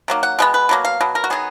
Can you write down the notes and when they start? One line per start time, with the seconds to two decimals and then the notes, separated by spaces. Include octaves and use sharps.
0.08 D#3 F#3 A#3
0.23 F#5
0.39 B2 G#3 B3
0.54 B4
0.69 B2 F#3 A#3
0.85 F5
1.01 B2 F#3
1.15 A#4
1.24 F#4
1.30 D#3 F#3 B3 G#4